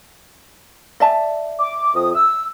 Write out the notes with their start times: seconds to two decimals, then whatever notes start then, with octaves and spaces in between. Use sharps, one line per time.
1.00 D5 E5 A5
1.60 D6
1.94 F2 D#6
2.14 E6